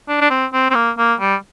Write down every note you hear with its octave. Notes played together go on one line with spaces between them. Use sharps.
D4
D4
C4
C4
C4
A#3
A#3
G3